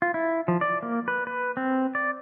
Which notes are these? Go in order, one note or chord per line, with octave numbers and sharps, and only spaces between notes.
F4
E4
F3
D5
A#3
B4
B4
C4
D5